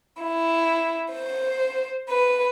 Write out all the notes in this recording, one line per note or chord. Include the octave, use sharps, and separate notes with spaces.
E4
C5
B4